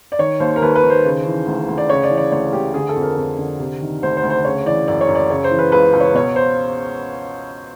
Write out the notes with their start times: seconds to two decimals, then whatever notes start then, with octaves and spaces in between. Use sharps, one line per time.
0.12 D5
0.19 D#3 C#5
0.40 D#2 C5
0.56 A#4
0.62 D#2 B4
0.75 B4
0.84 D#3
0.90 C5
1.05 C#3
1.26 E3
1.47 D2
1.68 D2
1.78 D5
1.89 C#3 C#5
2.04 D5
2.11 E3
2.17 D5
2.31 D2 C#5
2.53 D2 G4
2.74 D3 G#4
2.89 A4
2.96 F2
3.02 A#4
3.17 F2
3.38 D3
3.59 C3
3.81 D#3
4.03 D2 C5
4.17 C5
4.23 D2
4.30 C5
4.45 C#3 C#5
4.66 E3 D5
4.88 F#2 D5
5.01 C#5
5.08 F#2
5.15 D5
5.30 C#3 C#5
5.44 C5
5.51 E3
5.59 B4
5.72 C#2 B4
5.93 C#2
6.00 C#5
6.14 B2 C#5
6.36 C5